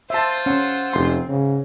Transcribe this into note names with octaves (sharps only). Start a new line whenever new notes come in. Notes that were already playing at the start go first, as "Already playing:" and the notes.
F4 C5 E5 A5
C#4 F#5 E6
F1 C4 C6
G#2 C#3